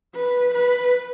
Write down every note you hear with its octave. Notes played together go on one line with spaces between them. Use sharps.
B4
B4